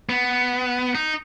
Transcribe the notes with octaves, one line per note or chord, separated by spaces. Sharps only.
B3
D#4